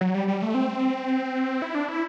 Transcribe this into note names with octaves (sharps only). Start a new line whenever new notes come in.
F#3
G3
G3
A3
C4
E4
D4
E4